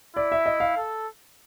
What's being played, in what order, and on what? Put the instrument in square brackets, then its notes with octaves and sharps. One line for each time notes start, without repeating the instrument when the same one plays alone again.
[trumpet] E4 [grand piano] D5
[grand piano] E5
D#5
F5
[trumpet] A4